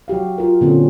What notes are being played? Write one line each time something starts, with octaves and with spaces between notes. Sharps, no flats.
F#3 F#4 G4 F5
F4 A#4
A#2 D3 C4 C#4